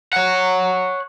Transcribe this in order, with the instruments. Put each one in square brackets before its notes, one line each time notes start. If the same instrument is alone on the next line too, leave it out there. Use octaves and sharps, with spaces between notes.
[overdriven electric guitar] C#5 F#5